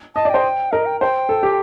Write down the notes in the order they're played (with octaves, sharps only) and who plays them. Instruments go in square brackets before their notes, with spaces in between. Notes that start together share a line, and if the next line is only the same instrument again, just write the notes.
[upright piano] D#5 [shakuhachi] A5
[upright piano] D5
[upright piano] C5 [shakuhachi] G5
[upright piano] A#4 [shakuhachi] D#5
[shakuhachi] G5
[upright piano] C5 [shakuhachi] G5
[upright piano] A4
G4